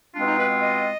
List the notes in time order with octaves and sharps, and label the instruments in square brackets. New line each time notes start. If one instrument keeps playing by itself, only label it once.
[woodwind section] B2 G#3 C4 F4 [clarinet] D4
[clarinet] D#4
B4
D#5